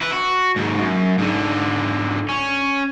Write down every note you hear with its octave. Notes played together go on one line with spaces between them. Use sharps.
E4 B4
F#4
D#2 G#2
F#2
G#2 D3
C#4